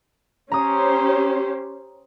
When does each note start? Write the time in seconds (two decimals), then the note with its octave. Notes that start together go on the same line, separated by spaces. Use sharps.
0.52 C#4 G4 C5 A#5 D#6